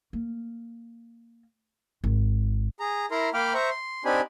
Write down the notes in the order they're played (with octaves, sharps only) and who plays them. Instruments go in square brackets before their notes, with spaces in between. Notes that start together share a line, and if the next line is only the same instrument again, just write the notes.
[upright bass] A#3
G#1
[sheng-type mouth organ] G#4 A#5
E4 A#4 A#5 C6
A#3 F5 G5 B5 D6 F6
C5 E5 A#5 C#6
C6
C4 D4 D#4 G4 G#5 B5